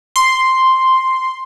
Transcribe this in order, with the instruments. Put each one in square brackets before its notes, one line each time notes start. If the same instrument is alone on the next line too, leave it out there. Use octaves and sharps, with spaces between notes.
[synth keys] C6